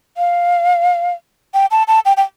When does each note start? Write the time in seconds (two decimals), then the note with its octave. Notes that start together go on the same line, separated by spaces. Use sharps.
0.17 F5
1.54 G5
1.71 A5
1.88 A5
2.05 G5
2.17 G5